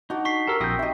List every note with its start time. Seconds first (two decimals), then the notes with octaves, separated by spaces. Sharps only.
0.10 D4 D#4 F#4 D5
0.25 C#6 B6 C7
0.47 G4 A4 A#4 E6
0.60 A#1 C4 E4 D#6 G6 A#6
0.79 D#4 G4 D#5 E5